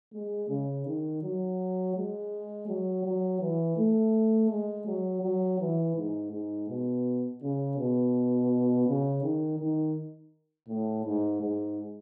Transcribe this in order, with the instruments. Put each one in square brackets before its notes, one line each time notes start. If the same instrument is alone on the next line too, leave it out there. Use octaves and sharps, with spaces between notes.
[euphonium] G#3
C#3
D#3
F#3
G#3
F#3
F#3
E3
A3
G#3
F#3
F#3
E3
G#2
G#2
B2
C#3
B2
C#3
D#3
D#3
A2
G#2
G#2